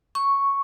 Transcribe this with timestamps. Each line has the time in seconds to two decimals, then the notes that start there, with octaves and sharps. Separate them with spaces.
0.15 C#6